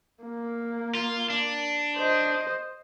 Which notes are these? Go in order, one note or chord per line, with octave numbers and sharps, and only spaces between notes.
A#3
F4
D4
C5 D#5